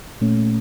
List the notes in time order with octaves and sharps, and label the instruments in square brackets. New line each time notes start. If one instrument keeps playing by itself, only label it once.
[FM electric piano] A#2 A3 C#4